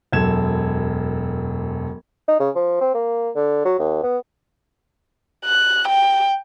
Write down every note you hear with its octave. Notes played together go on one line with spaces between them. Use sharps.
E1 F#2 A4 G#6 E7
D#4
C#3
F3
C4
A#3
D3
F#3
D#2
B3
F#6
G5